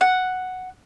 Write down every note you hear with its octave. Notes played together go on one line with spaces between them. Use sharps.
F#5